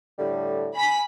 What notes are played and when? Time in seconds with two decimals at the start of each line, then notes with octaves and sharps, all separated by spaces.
0.19 A2 D3 G3
0.76 G#5 B5 B6